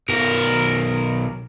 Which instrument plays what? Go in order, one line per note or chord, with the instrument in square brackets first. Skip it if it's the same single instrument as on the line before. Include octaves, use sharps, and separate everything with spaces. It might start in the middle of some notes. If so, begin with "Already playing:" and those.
[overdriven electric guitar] B1 A#4